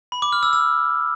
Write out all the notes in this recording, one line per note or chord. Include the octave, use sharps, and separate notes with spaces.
B5
D6
F6
E6
E6